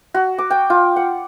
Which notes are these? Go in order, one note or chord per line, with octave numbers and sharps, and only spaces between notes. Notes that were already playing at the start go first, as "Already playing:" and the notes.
F#4
D6
G5
F4
F#5